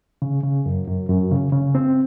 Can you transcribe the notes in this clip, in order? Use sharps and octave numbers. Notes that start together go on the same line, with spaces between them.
C#3
C#3
F#2
F#2
F#2
C#3
C#3
C4